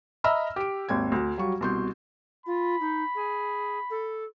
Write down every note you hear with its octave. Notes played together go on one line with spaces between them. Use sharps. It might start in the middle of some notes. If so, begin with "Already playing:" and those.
D#5 E5 A#5 B5 E6 F6
G4 D7
G#1 D#2 G5 G#6
D2
F#3 G3 F5 C#6
C2 B2 C6 C#6 G6
F4 B5
D#4
G#4
A4